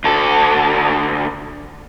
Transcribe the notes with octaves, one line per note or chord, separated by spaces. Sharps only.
D2 A4